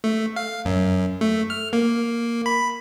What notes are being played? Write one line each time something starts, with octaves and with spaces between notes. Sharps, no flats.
A3
F5
F#2
A3
F6
A#3
B5